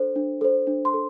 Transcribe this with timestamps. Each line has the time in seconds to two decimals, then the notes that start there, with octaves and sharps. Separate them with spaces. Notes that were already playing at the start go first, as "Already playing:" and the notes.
Already playing: D4 A4 C5
0.16 D4
0.41 A4 C5
0.67 D4
0.85 C6
0.94 A4